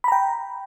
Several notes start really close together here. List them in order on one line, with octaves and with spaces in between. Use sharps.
B5 A#5 G5